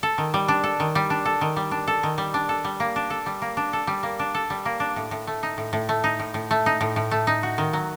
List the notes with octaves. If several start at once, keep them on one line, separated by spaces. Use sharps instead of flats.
A4
D#3
G3
D4
A4
D#3
G3
D4
A4
D#3
G3
D4
A4
D#3
G3
D4
A4
G3
A#3
D4
A4
G3
A#3
D4
A4
G3
A#3
D4
A4
G3
A#3
D4
A2
A2
A3
D#4
A2
A2
A3
D#4
A2
A2
A3
D#4
A2
A2
A3
D#4
F#4
D#3
F#3